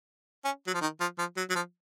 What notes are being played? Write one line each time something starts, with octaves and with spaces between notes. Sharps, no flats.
C#4
F#3
F3
D#3
F3
F3
F#3
F#3
F3